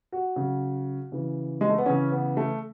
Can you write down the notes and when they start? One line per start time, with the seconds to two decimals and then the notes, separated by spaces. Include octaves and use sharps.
0.12 F#4
0.36 C#3 F#3
1.12 C#3 E3
1.61 G#3
1.69 A3
1.78 B3
1.86 C#3 E3 C#4
2.12 B3
2.37 A3